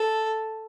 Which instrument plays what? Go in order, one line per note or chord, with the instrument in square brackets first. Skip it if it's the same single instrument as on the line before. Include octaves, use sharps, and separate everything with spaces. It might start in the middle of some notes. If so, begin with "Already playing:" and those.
Already playing: [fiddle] A4